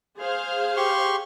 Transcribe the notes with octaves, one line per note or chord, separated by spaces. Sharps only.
G#4 C5 F5
G4 C6 C#6